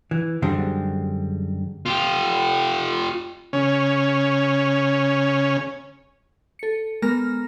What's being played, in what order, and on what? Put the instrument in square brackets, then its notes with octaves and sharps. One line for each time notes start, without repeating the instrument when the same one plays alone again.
[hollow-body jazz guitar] E3
F#2 D3 G3 G#3 C4
[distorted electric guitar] F4 G4
[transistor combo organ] C#3 C#4
[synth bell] A4 C#7
G#3 B3 A#4 A#5 F6 A#6